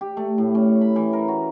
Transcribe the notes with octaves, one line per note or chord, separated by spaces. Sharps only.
G4
A3
A2
C#4
B5
E3
A#4
F#4